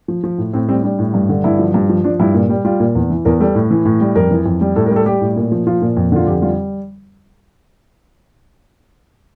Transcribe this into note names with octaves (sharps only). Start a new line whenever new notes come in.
F3
F3
A2
A2 C4
G3 C4
G3 D4
A2
G2
D3
G2 E4
F3
G2
F3
F3 D4
G2 E4
A#2
G3
G3 F4
A#2
E2
E3
E2 A#4
G3 A4
A2
E3
A2
G3
F2 A#4
E3
F2
G3
A2 A4
A#4
G3
A4
G3 G4
A2
A#2
F3
F3 F4
A#2
F2
D3 F4
F2 G4
G3 F4